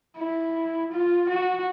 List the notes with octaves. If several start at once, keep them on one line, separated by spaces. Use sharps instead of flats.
E4
F4
F#4